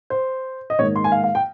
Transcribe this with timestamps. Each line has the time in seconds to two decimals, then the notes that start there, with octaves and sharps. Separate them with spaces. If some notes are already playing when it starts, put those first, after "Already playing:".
0.10 C5
0.70 D#5
0.79 G#2 D#3 A#3 D#4 C#5
0.96 C6
1.04 G#5
1.12 F5
1.23 F5
1.35 G5